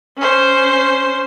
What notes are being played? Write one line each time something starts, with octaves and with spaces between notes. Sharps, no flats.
C#4 C5